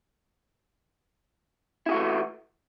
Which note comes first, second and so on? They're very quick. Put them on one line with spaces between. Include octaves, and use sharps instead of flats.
E4 G#4 F#4 A3 E3